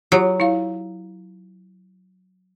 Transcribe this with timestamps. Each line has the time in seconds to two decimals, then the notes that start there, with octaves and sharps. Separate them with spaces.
0.12 F#3 F4 G4
0.40 E4 F5